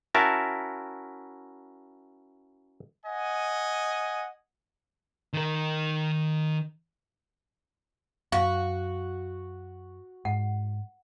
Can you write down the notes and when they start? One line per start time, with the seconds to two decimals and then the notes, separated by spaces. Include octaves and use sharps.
0.14 C#4 E4 F#4 A#4 E5 A5
3.06 D#5 F#5 G#5
5.33 D#3 A#4
8.32 F#2 F#4 F5
10.25 G#2 F#5